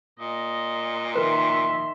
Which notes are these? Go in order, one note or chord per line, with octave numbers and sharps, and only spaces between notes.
A#2 D#5
D#3 A#4 B4 E5 C6